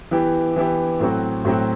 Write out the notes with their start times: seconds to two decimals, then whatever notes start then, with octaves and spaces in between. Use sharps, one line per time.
0.11 E3 B3 E4 G4
0.56 E3 B3 E4 G4
1.00 A2 F#3 C4 F#4
1.45 A2 F#3 C4 F#4